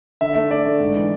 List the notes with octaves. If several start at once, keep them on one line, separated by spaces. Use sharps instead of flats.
D3 E5
A3
A3 D5
D3
G#2
E3